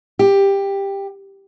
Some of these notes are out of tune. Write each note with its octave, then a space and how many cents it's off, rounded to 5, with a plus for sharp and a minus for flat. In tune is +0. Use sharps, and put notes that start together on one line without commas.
G4 +10